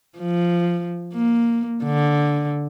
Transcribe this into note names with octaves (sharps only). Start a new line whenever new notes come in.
F3
A#3
D3